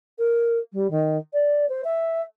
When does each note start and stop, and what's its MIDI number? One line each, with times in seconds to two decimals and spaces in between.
0.18 0.58 70
0.72 0.87 55
0.90 1.17 51
1.33 1.68 74
1.69 1.81 72
1.84 2.22 76